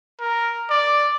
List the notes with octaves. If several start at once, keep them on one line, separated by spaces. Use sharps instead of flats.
A#4
D5